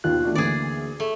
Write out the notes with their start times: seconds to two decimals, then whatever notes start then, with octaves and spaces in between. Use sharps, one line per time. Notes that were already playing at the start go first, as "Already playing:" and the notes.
0.04 D#2 B2 D#3 F4 F#6
0.23 A3 D4 F#4
0.35 D2 D3 E3 A#3 G#4 D5
1.00 A3